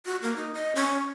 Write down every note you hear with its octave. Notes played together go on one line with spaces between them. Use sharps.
F#4
A#3
D#4
D#5
C#4